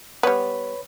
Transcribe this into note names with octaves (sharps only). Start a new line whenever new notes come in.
G3 B3 B4 C#5 B5